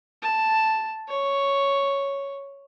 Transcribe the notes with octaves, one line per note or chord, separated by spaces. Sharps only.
A5
C#5